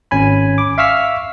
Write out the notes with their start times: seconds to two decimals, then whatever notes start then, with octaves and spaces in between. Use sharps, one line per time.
0.11 G#1 C#4 G#5 B5
0.58 D6
0.78 E5 F5 C#6 E6 F6 B6